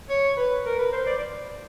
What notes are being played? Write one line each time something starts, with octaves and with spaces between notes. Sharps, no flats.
C#5
B4
A#4
B4
C5
D5